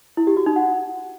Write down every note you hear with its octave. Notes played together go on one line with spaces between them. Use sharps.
E4
G4
F#4
D#4
F#5